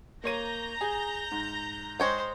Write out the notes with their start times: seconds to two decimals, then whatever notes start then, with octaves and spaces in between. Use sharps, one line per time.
0.24 A#3 C#5 A#5 G6 A#6 D#7
0.81 G#4
1.31 G#2
2.00 G#3 C5 C#5 G5